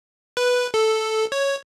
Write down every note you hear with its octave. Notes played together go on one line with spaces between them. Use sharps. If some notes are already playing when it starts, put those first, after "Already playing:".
B4
A4
C#5